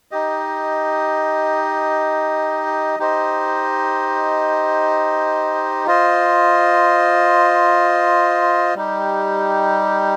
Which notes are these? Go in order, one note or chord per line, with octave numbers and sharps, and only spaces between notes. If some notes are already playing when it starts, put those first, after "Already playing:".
D#4 G4 D#5
D#4 G4 C5 D#5
F4 C5 D#5
G3 D#4 G4